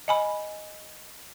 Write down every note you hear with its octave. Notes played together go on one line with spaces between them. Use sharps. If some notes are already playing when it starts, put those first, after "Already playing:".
D#5 G#5 B5